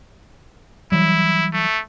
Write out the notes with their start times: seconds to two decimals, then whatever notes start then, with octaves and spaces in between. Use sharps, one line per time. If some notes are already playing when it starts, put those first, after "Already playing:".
0.92 E3 F#3 G3 E4
1.54 A3